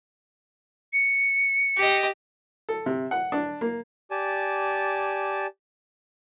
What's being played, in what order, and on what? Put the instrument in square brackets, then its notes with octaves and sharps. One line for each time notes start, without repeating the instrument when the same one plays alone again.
[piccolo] C#7
[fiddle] G4 D#5
[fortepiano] A4
C3
F#5
D4
A#3
[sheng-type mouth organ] G4 D5 G#5 A5